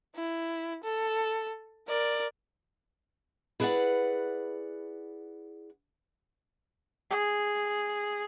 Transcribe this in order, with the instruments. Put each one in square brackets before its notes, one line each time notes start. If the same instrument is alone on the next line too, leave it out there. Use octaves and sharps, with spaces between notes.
[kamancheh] E4
A4
A#4 D5
[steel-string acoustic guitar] E4 G#4 B4 C5 D5 F#5
[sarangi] G#4